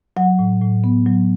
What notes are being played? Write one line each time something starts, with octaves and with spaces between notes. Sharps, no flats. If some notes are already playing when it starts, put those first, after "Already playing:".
F#3 F#5
A2
A2
B3
F#3